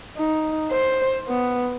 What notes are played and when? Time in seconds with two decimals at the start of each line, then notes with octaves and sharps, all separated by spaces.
0.17 D#4
0.71 C5
1.28 B3